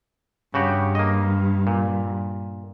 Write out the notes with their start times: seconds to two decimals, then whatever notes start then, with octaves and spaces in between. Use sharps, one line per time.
0.54 G2 C#3 F#4 G4
0.95 A#3 D#5
1.67 A#2